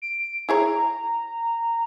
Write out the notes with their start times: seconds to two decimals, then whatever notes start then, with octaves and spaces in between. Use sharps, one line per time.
0.02 D7
0.49 E4 G#4 C#5 A#5